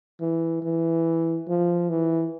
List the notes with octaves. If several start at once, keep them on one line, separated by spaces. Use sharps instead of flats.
E3
E3
F3
E3